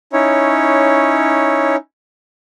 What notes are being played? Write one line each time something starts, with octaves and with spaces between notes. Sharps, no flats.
C#4 D#4 E4 C#5